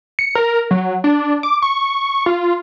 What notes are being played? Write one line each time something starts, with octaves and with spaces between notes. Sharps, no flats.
C#7
A#4
F#3
D4
D6
C#6
F4